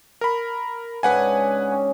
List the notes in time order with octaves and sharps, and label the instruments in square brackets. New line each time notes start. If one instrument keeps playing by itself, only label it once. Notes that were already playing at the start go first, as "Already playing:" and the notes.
[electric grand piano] A#4 B5
[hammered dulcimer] G#2 C#3 D4 [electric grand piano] B4 F#5 G#5
[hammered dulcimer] C#4